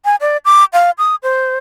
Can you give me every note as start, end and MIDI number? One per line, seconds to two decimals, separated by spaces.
0.05 0.16 80
0.21 0.37 74
0.45 0.65 86
0.73 0.91 77
0.98 1.15 87
1.23 1.57 72